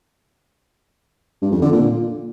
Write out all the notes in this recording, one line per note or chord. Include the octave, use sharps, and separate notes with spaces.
G2
F2
D3
A#2